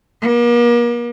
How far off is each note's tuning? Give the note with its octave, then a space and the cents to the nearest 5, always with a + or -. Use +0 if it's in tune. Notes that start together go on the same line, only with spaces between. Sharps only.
A#3 +40